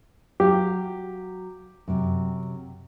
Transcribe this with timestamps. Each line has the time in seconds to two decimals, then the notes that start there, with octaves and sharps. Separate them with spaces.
0.40 F#3 G4 F5
1.88 F#2 C3